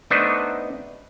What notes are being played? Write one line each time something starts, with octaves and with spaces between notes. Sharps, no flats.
A3 B3 D4 D#4 B4 C5